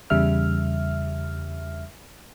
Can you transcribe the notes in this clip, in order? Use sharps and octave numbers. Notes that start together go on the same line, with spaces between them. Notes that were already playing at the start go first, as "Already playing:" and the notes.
E2 C#3 G3 E5 F6